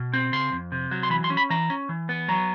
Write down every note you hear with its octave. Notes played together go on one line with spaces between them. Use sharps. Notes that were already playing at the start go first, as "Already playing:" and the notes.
Already playing: B2
C4
C#3 C6
F2
C3
F#3
C6
E3 B5
C6
C#4
B5
E3 A#5
C#4
E3
B3
F#3 A#5